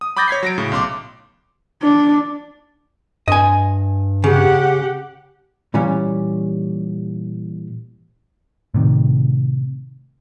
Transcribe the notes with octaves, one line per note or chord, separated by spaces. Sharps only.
D#6
B5 D6 D#6 G6 A6 A#6
C#5 G#6 B6 C7
F#3 A#6 D7
A2 C#3
B1 C6 D6
D4
G2 D#5 G#5
C#3 G4 F#5
A#2 E3 G3 C#4
A2 C3 D#3